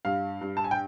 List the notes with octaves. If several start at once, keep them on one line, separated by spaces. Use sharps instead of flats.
G2 F5
G2
A5
G#5
G5